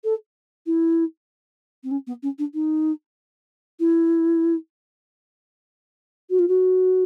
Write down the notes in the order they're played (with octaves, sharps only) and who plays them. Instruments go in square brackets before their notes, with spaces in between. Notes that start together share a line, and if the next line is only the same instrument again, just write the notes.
[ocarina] A4
E4
C4
C#4
B3
C#4
D4
D#4
E4
F#4
F4
F#4